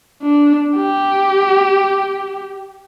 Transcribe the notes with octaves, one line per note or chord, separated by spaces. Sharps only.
D4
G4